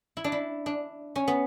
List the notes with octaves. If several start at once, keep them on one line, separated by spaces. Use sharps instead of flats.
E4
D4
E4
D4
C#4
B3